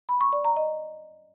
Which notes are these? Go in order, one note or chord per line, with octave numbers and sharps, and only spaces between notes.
B5
C#6
D5
A#5
D#5